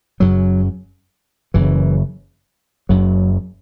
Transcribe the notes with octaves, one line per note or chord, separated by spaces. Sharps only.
F#1 F#2 C#3 F#3
F#1 F#2 C#3 E3
F#1 F#2 C#3 F#3